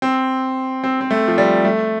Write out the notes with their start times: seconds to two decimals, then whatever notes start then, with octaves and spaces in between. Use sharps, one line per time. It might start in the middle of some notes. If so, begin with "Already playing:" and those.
0.02 C4
0.84 C4
1.01 C4
1.11 A3
1.28 F3
1.38 G3
1.65 A3